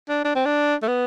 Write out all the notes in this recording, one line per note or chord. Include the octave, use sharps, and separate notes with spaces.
D4
D4
C4
D4
A3
B3